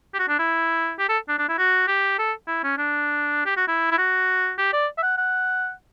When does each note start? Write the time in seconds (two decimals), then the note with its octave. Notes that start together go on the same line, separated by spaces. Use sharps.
0.14 G4
0.19 F#4
0.29 D4
0.39 E4
0.99 G4
1.09 A4
1.28 D4
1.39 D4
1.49 E4
1.58 F#4
1.88 G4
2.19 A4
2.48 E4
2.63 C#4
2.78 D4
3.46 G4
3.57 F#4
3.68 E4
3.91 E4
3.98 F#4
4.58 G4
4.73 D5
4.98 E5
5.03 F#5
5.17 F#5